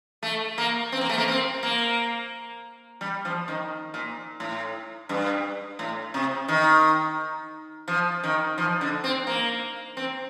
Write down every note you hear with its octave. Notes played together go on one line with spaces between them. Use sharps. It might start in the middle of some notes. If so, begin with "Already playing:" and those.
A3
A#3
C4
A#3
A3
A#3
C4
A#3
G3
F3
D#3
A#2
A2
G2
A2
C3
D#3
F3
D#3
F3
D3
C4
A#3
C4